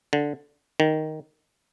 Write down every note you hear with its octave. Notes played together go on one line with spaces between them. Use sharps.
D3
D#3